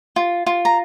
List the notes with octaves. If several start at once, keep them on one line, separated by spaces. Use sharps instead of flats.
F4
F4
A#5